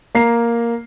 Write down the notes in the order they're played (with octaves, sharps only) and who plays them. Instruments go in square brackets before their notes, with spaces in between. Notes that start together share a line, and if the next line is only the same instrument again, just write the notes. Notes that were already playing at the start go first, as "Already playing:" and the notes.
[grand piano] A#3 A#5 C7